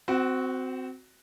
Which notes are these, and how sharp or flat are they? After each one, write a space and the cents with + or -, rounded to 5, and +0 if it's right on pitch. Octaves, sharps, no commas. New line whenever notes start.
C4 -15 F#4 +0 F#5 +40